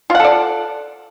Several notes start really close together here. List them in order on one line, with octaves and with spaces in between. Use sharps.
F4 F#5 A4 D5